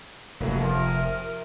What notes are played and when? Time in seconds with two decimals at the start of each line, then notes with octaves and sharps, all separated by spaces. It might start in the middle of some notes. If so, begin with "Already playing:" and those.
0.40 F1 C#3 F#3 A3 A#3
0.60 C3 F3 A#4